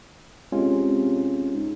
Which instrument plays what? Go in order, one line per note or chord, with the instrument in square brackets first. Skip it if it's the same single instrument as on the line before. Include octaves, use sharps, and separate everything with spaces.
[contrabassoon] C3 [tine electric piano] G#3 C#4 F4
[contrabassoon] G#2